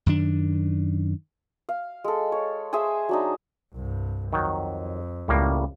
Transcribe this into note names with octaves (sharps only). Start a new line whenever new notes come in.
F#2 D#3 D4
F5
G#3 A4
C#5
G#4 C5 E5 G#5
F#3 D4 D#4
C2 G2
F2 D#3 F#3
C#2 A2 G3 A#3